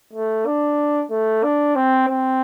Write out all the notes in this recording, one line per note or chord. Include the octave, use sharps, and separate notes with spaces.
A3
D4
A3
D4
C4
C4